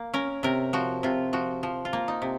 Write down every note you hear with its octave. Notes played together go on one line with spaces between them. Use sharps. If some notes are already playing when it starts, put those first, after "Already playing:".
Already playing: A#3
C#4 A#4
C3 A#4
F3 F#4
C3 F4
F3 F#4
F3
F4
A#3
D#4
C3